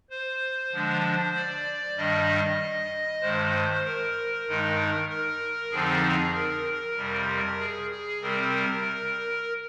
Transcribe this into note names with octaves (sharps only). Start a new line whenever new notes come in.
C5
D3 F3 G#3 D4
D5
G2 D#3 G3 D4 D#5
G2 D#3 G#3 C5
A#4
G2 D#3 G#3 D#4
A#4
F2 D3 F3 C4 D#4 G#4
A#4
F2 C3 G3
G#4
G#4
C3 G3 C4 A#4